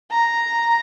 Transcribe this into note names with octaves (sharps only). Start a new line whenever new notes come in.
A#5